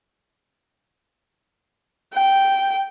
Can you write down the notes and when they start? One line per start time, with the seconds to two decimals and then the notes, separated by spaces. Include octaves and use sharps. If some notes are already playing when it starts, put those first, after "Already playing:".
2.15 G5